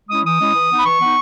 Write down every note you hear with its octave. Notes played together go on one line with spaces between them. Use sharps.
G#3 C#4 E4 D#6
E3 D#6
G#3 C#4 E4
E3
B3 D#4
B5
E3 C#6
B3 D#4